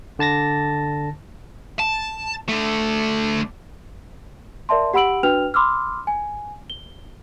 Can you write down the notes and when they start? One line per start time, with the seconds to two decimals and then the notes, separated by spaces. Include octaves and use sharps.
0.19 D3 A5 A6 A#6
1.79 A5
2.48 D3 A3
4.69 A#4 D5 E5 A5 C6
4.94 G4 F#5 B5 E6 D7 F#7
5.23 D4 F#4 B4 G5 F6 F7
5.54 B5 C6 D6 E6 F6
6.07 G#5
6.70 G7